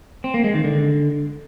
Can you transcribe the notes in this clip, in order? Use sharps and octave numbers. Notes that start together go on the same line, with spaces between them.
C4
A#3
G#3
D#3
D3